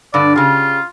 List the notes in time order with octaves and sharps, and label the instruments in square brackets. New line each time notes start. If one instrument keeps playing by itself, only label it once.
[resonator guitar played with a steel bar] G2 D3 [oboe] D5
[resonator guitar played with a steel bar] C#3 G4 [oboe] F4